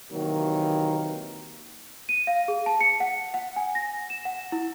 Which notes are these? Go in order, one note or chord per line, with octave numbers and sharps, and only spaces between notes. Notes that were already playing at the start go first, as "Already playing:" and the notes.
C3 D#3 E3 F#3 A#3
D#7
F5
G#4
A5
C#7
F#5
F#5
G#5
A#6
E7
F#5
E4